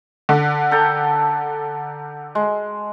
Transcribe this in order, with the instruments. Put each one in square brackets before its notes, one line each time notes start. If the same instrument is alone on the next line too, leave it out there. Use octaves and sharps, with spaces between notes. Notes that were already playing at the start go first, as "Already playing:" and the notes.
[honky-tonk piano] D3
[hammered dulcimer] A4 G5 A#5
G#3